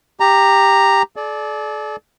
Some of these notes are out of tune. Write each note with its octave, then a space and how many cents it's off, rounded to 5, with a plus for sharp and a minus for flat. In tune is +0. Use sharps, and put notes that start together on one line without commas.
G4 +10 A#5 -5
A4 -45 D5 +0